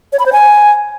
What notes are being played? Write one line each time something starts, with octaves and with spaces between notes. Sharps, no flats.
C#5
B5
C5
G#5